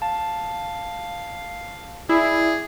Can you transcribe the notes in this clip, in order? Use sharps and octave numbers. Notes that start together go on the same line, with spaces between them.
F5 A5
E4 G#4 D5